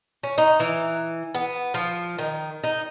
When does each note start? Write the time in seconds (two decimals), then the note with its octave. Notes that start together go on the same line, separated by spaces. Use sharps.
0.23 C#4
0.38 D#4
0.60 E3
1.34 B3
1.74 F3
2.19 D#3
2.64 D#4